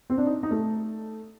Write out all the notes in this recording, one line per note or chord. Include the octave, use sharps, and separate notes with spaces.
C4
D4
D#4
D#4
A3